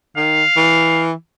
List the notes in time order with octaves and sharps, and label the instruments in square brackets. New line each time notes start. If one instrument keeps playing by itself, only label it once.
[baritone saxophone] D#3 [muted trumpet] F5
[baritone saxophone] E3